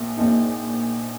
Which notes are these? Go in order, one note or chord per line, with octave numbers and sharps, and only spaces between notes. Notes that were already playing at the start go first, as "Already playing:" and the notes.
Already playing: A#1 A#2
A#1 A#2 F3 G#3 D#4